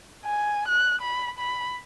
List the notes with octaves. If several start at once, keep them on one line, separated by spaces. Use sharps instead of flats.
G#5
F#6
B5
B5